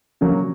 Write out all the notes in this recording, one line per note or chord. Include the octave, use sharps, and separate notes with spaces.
C#3 F#3 A#3